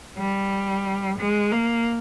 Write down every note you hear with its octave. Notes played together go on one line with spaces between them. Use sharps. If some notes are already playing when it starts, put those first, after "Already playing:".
G3
G#3
A#3